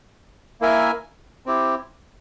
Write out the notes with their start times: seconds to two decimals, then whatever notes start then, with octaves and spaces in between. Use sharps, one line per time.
0.61 A#3 E4 A#4 E5 G#5
1.46 C4 E4 G4